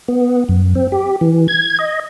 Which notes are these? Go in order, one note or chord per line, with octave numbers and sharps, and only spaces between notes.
B3
F#2
C4
G4
E3
G#6
D#5